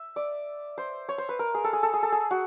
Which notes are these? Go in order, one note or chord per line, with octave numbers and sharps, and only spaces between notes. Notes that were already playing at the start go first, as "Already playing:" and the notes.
Already playing: E5
D5
C5
C#5
C5
B4
A#4
G#4
A4
G#4
A4
G#4
A4
G#4
F#4